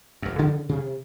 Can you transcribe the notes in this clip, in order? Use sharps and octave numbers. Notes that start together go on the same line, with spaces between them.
F1 F#2
C#3 E3 F3
C3